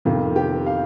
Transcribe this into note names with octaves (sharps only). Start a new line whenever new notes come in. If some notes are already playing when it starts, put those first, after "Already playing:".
F2 C3 D#3 F4
G4
F5